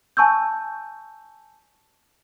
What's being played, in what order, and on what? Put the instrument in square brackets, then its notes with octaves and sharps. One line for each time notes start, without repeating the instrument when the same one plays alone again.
[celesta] G#5 A5 C#6 E6 G6